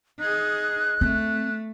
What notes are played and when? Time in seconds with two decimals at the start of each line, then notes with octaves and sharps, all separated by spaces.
0.20 D#4 G#4 F#6
1.01 A3 C4